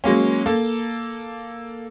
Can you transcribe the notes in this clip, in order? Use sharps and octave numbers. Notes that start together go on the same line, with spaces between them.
F#3 G#3 A#3 C#4
A#3 A4